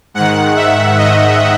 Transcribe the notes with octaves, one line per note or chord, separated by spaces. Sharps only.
G#2 D#3 F#5
E5
D#5